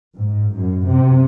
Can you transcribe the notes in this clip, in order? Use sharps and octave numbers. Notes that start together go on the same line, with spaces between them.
G#2
F#2
C3